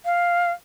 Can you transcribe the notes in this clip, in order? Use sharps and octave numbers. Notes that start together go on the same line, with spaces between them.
F5